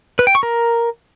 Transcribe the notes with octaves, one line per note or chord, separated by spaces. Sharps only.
B4
G5
C#6
A#4